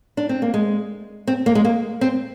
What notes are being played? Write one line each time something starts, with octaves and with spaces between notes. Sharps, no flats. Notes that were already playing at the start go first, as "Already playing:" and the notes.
D4
C4
A#3
G#3
C4
A#3
G#3
A#3
C4